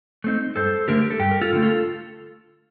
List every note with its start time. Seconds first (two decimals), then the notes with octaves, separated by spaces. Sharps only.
0.24 A3 C4 D#4
0.56 G2 A4 C5
0.88 D3 A3 G4 A#4
1.01 A#4
1.10 A4
1.20 G2 G4
1.31 A#4
1.41 F4 A4
1.53 D3 A3
1.63 F4 A4